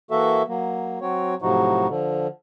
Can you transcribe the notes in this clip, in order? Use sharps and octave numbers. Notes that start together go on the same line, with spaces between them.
E3 A#3 F#4 A4 E5
F#3 A#3
F#3 C4 F#4 C#5
A2 C3 F3 F#3 D#4 F#4
D3 F3